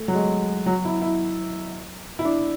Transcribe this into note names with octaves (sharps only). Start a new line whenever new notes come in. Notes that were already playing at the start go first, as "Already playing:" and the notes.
Already playing: A3
F#3
G#3
F#3
E4
E4
E4
D4